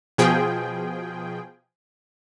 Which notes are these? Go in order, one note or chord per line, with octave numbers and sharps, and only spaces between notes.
B2 F3 G#4 G5